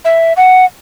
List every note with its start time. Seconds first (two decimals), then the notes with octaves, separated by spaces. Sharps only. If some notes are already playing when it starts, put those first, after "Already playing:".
0.05 E5
0.37 F#5